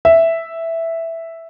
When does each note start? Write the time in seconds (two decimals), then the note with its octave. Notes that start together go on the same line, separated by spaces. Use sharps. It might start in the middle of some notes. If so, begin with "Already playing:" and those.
0.05 E5